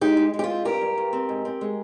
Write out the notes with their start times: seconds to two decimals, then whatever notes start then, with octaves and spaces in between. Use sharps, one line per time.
0.01 G#3 D#4 G4
0.17 G#3
0.34 G#3
0.39 G4
0.44 F4
0.50 C4
0.65 G2 G4 A#4
0.81 G2
0.98 G2
1.13 C4
1.29 G#2
1.45 C4
1.61 G#3